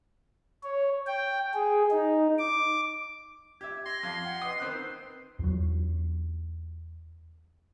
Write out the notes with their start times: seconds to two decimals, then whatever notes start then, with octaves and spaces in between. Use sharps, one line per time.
0.63 C#5
1.07 G5
1.54 G#4
1.91 D#4
2.38 D6
3.61 G4 E5 G#6
3.86 C6 A#6
4.03 F2 F5
4.24 F#5 G5
4.42 B4 D#5 D#6 C7
4.60 D#3 C4 F#6
5.39 E2 F#3